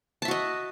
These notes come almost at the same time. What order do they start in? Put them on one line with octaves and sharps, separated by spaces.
A5 E5 F#4 D#5